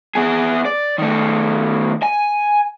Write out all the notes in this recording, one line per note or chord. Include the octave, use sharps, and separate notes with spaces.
B3 G#4
D5
D#3 A3
G#5